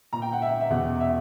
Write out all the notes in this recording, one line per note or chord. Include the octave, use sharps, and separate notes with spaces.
A#2 A#5
G5
F#5
E5
E5
E2 B2 F#5
E5